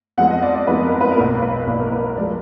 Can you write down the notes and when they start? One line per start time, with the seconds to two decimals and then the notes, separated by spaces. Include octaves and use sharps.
0.17 F2 F3 G#3 B3 F#5
0.30 D#5
0.42 D5
0.55 D5
0.67 F2 F3 G#3 B3 B4
0.84 A#4
1.01 B4
1.11 A#4
1.17 B1 B2 A#3 B4
1.42 B4
1.67 B1 B2 A#3 D5
1.80 A#4
1.92 B4
2.04 B4
2.17 F3 G#3 D5